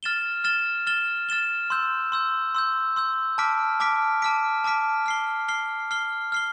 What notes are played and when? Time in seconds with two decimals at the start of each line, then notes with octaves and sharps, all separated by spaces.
0.03 F6 A6 E7 G7
0.44 F6 A6 E7 G7
0.87 F6 A6 E7 G7
1.29 F6 A6 E7 G7
1.70 C6 E6 G6
2.12 C6 E6 G6
2.55 C6 E6 G6
2.96 C6 E6 G6
3.38 A5 D6 F6 B6 D7
3.80 A5 D6 F6 B6 D7
4.22 A5 D6 F6 B6 D7
4.64 A5 D6 F6 B6 D7
5.06 F6 C7 G7
5.48 F6 C7 G7
5.91 F6 C7 G7
6.32 F6 C7 G7